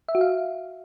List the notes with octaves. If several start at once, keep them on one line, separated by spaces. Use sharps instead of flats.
E5
F#4
F5